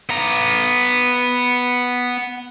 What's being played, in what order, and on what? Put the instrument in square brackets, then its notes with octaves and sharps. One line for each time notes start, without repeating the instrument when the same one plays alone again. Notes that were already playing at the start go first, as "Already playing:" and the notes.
[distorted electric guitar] B3 A#5